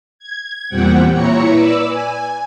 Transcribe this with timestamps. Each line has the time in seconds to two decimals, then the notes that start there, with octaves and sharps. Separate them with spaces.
0.19 G#6
0.69 E2 A#2 G3 C4 F#5 G5
1.13 A#2 E4 C#5 A#5 C#7
1.48 B4 D5 E6
1.88 G#5